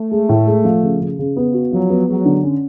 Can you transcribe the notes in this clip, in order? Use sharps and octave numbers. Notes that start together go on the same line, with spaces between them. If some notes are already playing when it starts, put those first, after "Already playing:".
Already playing: A3
G#3
A2
G#3
F3
C#3
C#3
C#3
B3
F#4
F3 F#3
B3
F#3 G#3
D3
C#4